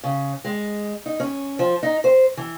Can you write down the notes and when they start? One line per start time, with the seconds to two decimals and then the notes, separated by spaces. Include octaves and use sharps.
0.04 C#3
0.44 G#3
1.06 D#4
1.20 C#4
1.59 F3
1.83 D#4
2.04 C5
2.37 E3